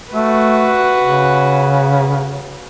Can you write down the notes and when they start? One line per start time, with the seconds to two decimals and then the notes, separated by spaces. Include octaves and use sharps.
0.13 A3 F#4 B4
1.03 C#3